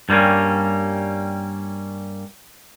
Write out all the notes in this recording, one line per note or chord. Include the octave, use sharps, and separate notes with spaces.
G2 G3 A3 A#3 C#4